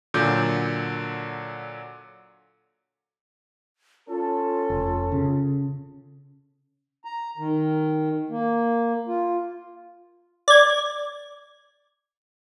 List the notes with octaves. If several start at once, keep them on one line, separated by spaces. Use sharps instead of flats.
A#2 D3 F#3 G6
C#4 F4 A4
F1
C#3
A#5
D#3
A#3
F4
D5 G#6